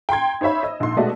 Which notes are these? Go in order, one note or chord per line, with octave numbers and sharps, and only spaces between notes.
G5 A#5 C6 G#6
D#4 C5 C#5 E5 B5
D#5 E6
A#1 G#2 C6
B2 G#3 A3 F#4 D5 D#5